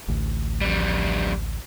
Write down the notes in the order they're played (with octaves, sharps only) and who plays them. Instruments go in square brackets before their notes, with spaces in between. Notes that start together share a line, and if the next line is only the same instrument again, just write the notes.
[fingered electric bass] A1 D2
[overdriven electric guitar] F2 G3